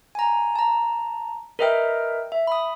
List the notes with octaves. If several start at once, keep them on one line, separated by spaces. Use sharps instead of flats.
G#5 A#5
A5 A#5
A#4 B4 D#5 E5 G5 F6
E5
B5 D#6